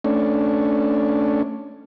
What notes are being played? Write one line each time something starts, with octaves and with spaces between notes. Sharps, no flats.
A3 C#4 D4